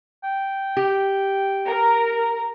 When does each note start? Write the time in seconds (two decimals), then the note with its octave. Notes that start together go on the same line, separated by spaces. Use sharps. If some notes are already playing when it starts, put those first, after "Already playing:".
0.24 G5
0.77 G4
1.66 A#4